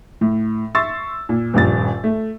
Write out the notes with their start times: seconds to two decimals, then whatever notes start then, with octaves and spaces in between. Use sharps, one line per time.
0.21 A2
0.75 E5 C6 C#6 E6 A6
1.29 A#2
1.54 D#1 A#1 G2 A6
2.04 A3